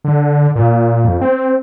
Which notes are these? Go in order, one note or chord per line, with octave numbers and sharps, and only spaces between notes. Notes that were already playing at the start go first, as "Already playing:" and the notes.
D3
A#2
F2
C4